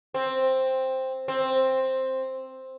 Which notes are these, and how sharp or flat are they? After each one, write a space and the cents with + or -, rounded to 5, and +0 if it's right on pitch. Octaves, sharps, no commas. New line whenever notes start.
C4 +5
C4 +5